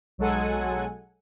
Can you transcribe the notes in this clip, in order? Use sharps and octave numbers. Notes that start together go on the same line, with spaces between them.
B1 F#3 G#3 A4 F#5 G#5